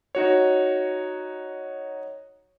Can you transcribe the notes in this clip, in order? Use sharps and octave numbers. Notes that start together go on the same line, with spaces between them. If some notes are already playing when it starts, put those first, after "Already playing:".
D#4 F#4 C#5